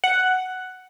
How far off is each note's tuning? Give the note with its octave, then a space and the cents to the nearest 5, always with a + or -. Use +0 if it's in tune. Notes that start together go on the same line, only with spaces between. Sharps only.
F#5 +5